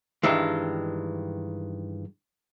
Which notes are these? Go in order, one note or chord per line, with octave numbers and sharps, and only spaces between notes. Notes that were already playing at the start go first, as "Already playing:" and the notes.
G2 D#3 E3 G#3